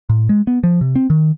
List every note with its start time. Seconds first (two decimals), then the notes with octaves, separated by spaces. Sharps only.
0.09 A2
0.29 G#3
0.47 B3
0.63 F3
0.81 C3
0.96 C4
1.10 D#3